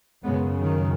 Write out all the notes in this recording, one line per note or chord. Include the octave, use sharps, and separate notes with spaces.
F#2 C#3 G#3 B3
D#3